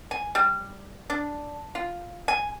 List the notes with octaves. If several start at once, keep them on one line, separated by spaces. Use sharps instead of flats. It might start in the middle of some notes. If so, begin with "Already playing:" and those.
G#5
G3
D4
F4
G#5